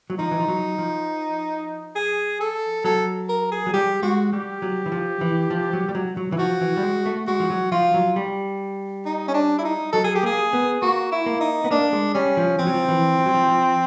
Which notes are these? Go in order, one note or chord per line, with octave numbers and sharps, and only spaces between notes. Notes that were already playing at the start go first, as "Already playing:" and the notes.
F#3
F3 D#4
E3
F3
F#3
F3
G#4
A4
F#3 A4
A#4
G#4
F#3
G3 G4
G#3 F#4
G3 G4
F#3
E3
F3
E3
F3
F#3
G3
F#3
F#3
E3
F3 F#4
E3
G3
G#3
A3
G#3 F#4
F3
F#3
F3 F4
F#3
G3
D#4
C#4
D4
E4
D#4
F#3 A4
G#4
G4
A#3 G#4
B3
A#3 F#4
E4
A#3
D#4
B3
A#3 D4
G#3
G3 C#4
F3
F3 C4
F#3
F3
E3
F3
F#3
F3
F3